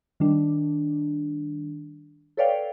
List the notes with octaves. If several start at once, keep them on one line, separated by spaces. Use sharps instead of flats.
D#3 G3 D4
A4 B4 C#5 D5 F5 G5